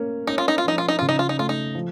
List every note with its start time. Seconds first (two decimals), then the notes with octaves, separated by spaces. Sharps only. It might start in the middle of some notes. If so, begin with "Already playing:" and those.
Already playing: A#3 C#4
0.27 C#4 D#4
0.38 F4
0.48 D#4
0.58 F4
0.64 F3 D#4
0.78 F4
0.89 D#4
0.99 C#3 F4
1.09 D#4
1.19 F4
1.29 D#4
1.38 A3 F4
1.49 D#4
1.75 F3